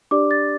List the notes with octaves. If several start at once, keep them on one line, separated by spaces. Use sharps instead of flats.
D4 G4 D5 D6
A6